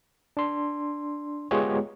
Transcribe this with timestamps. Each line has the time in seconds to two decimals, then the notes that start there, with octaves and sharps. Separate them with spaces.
0.37 D4 C6
1.51 G#3 B3 F4 G4 G#4 C#5